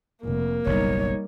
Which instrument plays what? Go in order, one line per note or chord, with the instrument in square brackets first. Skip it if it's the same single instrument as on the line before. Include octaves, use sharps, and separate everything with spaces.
[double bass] F1 [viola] A#3
[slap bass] F#1 B1 [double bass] G3 [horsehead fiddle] D#4 C#5